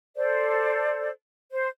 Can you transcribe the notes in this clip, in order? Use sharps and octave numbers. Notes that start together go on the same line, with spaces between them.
A4 C5 D5
C5